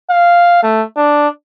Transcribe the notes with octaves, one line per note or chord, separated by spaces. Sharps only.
F5
A3
D4